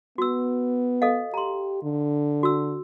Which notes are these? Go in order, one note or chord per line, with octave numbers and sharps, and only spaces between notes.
B3 F#4 E6
A4 D#5 F5
G4 A#5 C6
D3
F#4 E6